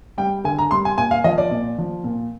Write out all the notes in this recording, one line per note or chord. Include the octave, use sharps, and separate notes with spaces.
G3 G5
D3 G#5
A#5
G3 C6
G#5
A#2 G#5
F5
F3 D#5
D5
A#2
F3
A#2